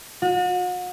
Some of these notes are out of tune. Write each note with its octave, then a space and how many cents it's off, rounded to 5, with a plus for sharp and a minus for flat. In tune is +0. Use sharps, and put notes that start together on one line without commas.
F#4 -40